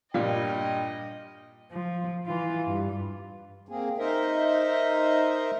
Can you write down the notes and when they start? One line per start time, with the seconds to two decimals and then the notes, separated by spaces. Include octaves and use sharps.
0.14 G2 A#2 G3 F4 D5 D#5 F5 G5
1.72 F3
2.27 E3 F4
2.67 G2
3.69 A#3 C4 G#4
3.98 D#4 A#4 C5 D#5 E5